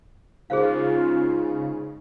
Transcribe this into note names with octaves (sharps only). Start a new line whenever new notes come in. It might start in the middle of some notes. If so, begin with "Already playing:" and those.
G#2 C#3 F4 G#4 C5 F5